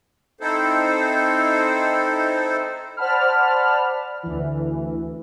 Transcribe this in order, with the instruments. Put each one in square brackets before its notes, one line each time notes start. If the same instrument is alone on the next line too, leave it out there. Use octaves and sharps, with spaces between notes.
[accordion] C4 D#4 E4 A4 C5
[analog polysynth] C5 D5 F#5 A5 B5 F6
D2 E3